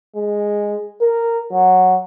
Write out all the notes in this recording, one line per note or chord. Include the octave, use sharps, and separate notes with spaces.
G#3
A#4
F#3